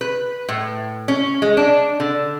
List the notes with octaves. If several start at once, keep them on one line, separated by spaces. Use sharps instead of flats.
B4
A2
C#4
G#3
D4
D3